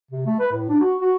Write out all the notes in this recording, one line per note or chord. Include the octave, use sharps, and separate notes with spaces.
C3
A3
B4
A2
D4
F#4
F#4